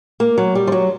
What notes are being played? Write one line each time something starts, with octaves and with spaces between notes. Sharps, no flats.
A#3
F#3
G3
F3
F#3